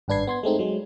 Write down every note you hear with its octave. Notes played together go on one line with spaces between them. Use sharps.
G#1 G2 D4 B4 G#6 C7
B3 C6 G#6
G#3 A3 C4 D#4
F#3 G#3